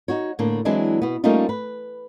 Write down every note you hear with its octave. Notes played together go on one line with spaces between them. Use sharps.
D#4 F#4 C#5
A2 D3 A#3 D4
E3 F#3 G#3 C4 D4 E4
B2 B3
G3 A3 A#3 C#4 D#4 F4
B4